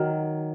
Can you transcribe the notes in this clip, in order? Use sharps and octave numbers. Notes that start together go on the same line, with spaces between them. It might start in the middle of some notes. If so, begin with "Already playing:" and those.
Already playing: D#3 F#3